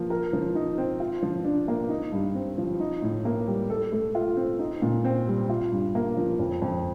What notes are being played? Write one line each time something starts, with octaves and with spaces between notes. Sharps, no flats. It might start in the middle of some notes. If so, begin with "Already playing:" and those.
Already playing: F3 A#3
A#4
F3
D#4
C4
F4
F3
D4
A#3
D#4
G2
C4
F3
D#4
A2
A#3
G3
A4
A3
F4
C4
D#4
A#2
C4
G3
F4
G2
A#3
F3
F2
F2